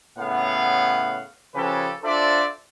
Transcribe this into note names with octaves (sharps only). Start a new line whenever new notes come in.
A2 C#3 B3 F5 F#5
C#3 F3 C#4 G4 A4 B4
D4 F4 A4 C5 D5 E5